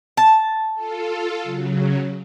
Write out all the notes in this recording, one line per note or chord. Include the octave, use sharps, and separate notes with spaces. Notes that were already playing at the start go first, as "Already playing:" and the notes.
A5
F4 A4
C#3 F#3